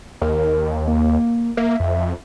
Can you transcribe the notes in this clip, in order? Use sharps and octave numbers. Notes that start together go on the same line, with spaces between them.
D#2 A#4
A#3
A#3 E5
F2